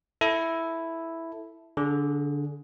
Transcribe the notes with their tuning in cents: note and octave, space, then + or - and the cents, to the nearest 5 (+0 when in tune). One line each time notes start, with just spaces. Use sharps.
E4 +0 A4 +0
D3 -15 G#4 +15